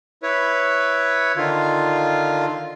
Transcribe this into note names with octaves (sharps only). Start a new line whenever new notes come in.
E4 B4 C#5
D3 D#3 F4